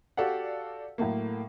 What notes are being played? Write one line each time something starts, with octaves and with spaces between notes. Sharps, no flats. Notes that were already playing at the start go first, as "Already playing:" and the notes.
F#4 G4 A4 D5 F5 F#5
A2 F#3 A3 A#3